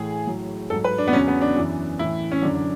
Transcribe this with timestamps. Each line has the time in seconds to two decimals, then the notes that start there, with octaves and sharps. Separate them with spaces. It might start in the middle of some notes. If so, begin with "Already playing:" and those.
Already playing: A2 E3 G#4
0.27 A2 F#3
0.70 G#2 F#3 A4
0.84 B4
0.98 D4
1.07 B3
1.12 E2 C#3 F#3 C#4
1.28 B3
1.41 D4
1.56 F#2 E3
1.99 A2 E3 E4
2.31 C#4
2.42 F#3 D4
2.45 F#2 D3
2.55 D4